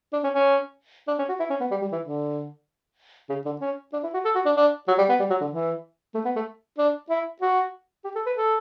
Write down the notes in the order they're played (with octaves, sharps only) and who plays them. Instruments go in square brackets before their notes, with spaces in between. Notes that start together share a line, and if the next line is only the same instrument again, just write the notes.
[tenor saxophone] D4
C#4
C#4
D4
C#4
F#4
E4
C#4
B3
G3
G3
E3
D3
C#3
D3
C#4
D4
E4
F#4
A4
F#4
D4
D4
F#3
G3
B3
G3
F#3
D3
E3
A3
B3
A3
D4
E4
F#4
G4
A4
B4
A4